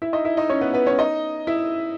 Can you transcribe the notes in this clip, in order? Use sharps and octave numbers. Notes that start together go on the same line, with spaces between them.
E4 E5
D#4 D#5
E4 E5
D#4 D#5
C#4 C#5
B3 B4
B3 B4
C#4 C#5
D#4 D#5
E4 E5